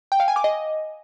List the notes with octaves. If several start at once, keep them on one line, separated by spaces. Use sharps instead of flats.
G5
F5
G#5
D6
D#5